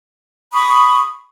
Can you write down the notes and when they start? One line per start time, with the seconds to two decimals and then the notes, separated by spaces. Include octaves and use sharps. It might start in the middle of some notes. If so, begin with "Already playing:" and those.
0.53 B5 C#6 D#6